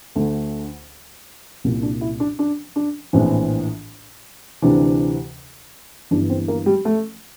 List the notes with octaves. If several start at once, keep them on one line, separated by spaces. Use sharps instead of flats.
D2 D3 A3
C2 A#2
D4
E4
D4
D4
D4
A#1 A2 E3 C4
D2 C3 E3 D4
G1 G2 E3 D4
C4
A#3
G3
A3